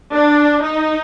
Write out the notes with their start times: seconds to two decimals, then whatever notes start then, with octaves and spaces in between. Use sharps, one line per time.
0.14 D4
0.63 D#4